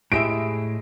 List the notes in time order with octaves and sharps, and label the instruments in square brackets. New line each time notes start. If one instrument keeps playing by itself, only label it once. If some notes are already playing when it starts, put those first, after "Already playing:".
[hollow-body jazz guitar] A2 G4 E5 [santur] G#3 E4 [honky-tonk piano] D7